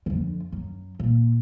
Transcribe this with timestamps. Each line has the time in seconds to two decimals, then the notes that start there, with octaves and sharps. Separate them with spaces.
0.06 F2 D3
0.52 F#2
0.99 A#2